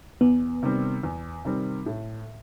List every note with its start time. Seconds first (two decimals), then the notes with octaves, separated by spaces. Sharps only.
0.21 E2 B3
0.63 C3 D#3 G3 C4
1.03 E2
1.45 C3 D#3 G3 C4
1.86 A2